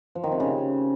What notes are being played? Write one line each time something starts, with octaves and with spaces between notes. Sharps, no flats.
F3
D#3
C3
C#3